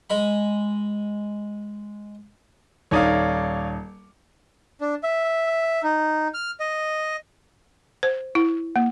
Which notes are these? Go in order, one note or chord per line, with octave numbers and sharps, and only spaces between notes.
G#3 B5
D#1 D#4 C#5 D5 F5 D#6
D4
E5
D#4
F6
D#5
C5
E4
A#3